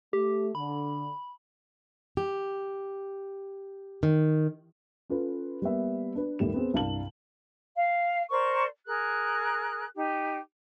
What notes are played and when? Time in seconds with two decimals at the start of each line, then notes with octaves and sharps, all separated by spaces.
0.13 A3 G4
0.55 D3 B5
2.17 G4
4.03 D#3
5.10 C#4 F4 A4 B4
5.62 G3 A#3 B3 E5
6.15 D4 B4
6.39 D#2 A2 G3 E7
6.54 B3 C4 G#4
6.74 C2 G2 F5 A5 F#7
7.75 F5
8.30 A#4 C5 D5 C#6
8.86 G#4 A#4 F#6
9.96 D#4 G4